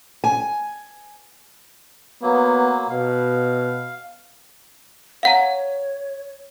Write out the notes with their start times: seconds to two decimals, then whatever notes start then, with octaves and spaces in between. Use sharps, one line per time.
0.24 G#5
2.22 F#3 A#3 B3
2.90 B2 F5
5.23 C#5 F5 F#5 A#5